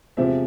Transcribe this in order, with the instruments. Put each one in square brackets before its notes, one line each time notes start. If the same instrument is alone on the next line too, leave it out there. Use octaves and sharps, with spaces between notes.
[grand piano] E2 C3 F3 G#3 C4 E5